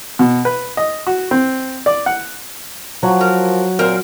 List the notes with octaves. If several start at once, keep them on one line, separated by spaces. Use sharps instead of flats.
B2
B4
D#5
F#4
C4
D5
F#5
F3 F#3
A#4
A#2 C4 A#4 C5